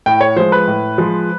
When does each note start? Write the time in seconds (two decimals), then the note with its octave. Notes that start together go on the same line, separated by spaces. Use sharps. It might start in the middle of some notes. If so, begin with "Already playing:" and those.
0.06 A2 G5
0.21 C#5
0.36 F3 G#3 C5
0.52 B4
0.67 A2
0.98 F3 G#3